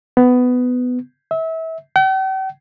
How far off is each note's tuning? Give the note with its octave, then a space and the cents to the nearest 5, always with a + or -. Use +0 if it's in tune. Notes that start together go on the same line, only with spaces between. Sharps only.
B3 +15
E5 -30
G5 -45